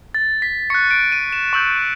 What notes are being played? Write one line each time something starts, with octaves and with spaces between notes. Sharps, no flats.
A6
B6
C#6 F#6 C#7
D7
D#7
E7
C#6 E6 G6 F#7